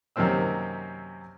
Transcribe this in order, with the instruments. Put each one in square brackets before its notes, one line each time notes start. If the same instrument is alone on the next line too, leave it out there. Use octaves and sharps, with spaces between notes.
[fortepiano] F#2 C3 D#3 A#3 C4 E6